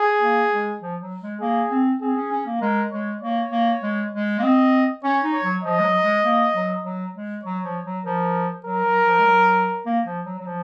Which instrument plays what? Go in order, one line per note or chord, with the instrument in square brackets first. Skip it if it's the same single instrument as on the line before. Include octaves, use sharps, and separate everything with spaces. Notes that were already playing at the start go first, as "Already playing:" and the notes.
Already playing: [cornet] G#4
[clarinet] A#3
G#3
F3
F#3
G#3
[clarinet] A#3 [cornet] G#4
[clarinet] C4
[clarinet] C4 [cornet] G#4
[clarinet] C#4
C#4
A#3
[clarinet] G#3 [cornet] A#4
[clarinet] G#3 [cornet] C#5
[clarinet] A#3 [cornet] C#5
[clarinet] A#3
G#3
G#3
A#3
[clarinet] C4 [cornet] D#5
[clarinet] C#4 [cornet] C#5
[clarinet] D#4
[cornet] C#5
[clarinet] F#3
[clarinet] F3 [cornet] D#5
[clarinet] G#3
F#3
G#3
A#3
F#3
F#3
G#3
[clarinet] F#3 [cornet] C#5
[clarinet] F3
F#3
[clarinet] F3 [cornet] A#4
[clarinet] F#3 [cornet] A#4
[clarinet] F#3
F3
G#3
F#3
A#3
F3
F#3
F#3
F3